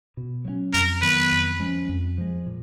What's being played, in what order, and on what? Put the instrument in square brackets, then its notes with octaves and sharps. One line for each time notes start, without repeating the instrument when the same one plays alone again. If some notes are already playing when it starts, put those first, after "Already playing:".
[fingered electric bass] B2
F#3 A#3 C#4
[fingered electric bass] F2 [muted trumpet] A#4
[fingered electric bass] D#3 F#3 B3 [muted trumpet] B4
[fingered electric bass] F2
F3 G#3 C#4
F2
F3 G#3
A#2